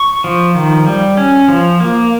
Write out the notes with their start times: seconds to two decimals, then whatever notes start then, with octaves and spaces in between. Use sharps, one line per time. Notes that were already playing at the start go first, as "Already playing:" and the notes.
Already playing: C#6
0.24 F3
0.55 D#3
0.86 G3
1.17 C#4
1.48 F3
1.80 A#3